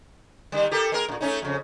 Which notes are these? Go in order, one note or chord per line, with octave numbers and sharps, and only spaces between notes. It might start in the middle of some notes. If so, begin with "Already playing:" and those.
D#3 G3
G4 A4 A#4
G#3 A#4
F#2 A#2
A3 C#4 D#4
F2 C#3